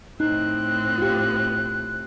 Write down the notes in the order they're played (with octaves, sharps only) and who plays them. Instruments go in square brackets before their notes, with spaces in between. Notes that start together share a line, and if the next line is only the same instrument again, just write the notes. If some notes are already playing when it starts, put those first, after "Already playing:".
[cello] A2 C4 [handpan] D#4 [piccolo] F#6
[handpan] F4 G4